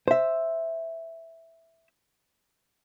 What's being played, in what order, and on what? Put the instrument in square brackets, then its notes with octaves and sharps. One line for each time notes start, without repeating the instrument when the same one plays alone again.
[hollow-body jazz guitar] C5 E5